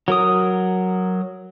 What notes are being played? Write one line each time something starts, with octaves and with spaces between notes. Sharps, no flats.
F#3 A#4 D#6